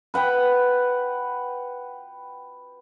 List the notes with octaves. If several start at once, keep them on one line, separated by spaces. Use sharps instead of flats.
B4 F#5 G5 B5